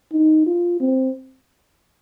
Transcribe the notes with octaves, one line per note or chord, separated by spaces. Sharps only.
D#4
F4
C4